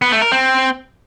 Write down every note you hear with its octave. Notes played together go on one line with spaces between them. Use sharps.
B3
A3
A#4
C4